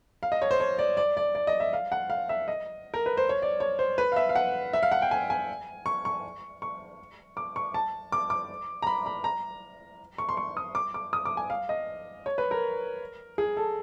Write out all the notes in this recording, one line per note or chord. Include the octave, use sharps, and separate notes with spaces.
F5
D#5
C#5
C5
C#5
D5
D5
D5
D5
D#5
E5
F5
F#5
F5
E5
D#5
A#4
B4
C5
C#5
D5
C#5
C5
B4
F5
E5
F5
F#5
E5
F5
F#5
G5
G#5
G#5
C#6
C#6
C#6
D6
C#6
A5
D6
D6
A#5
B5
B5
A#5
C#6
C6
C#6
D#6
D6
D6
D#6
D6
G#5
F5
D#5
C#5
B4
A#4
G#4
A4